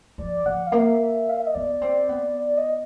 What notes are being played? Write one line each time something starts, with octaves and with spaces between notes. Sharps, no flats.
F3 D5
F3 F#5
F5
A#3 E5
F5
E5
D#5
B3 D5
C4
B3
D5
D#5